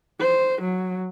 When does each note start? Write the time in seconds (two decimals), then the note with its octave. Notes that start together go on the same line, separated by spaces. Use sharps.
0.20 C5
0.61 F#3